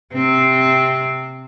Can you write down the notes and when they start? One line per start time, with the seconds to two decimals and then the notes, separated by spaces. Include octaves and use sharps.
0.14 C3 C4